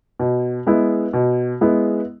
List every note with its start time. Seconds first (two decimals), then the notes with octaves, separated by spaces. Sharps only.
0.20 B2
0.67 G#3 B3 E4
1.13 B2
1.61 G#3 B3 E4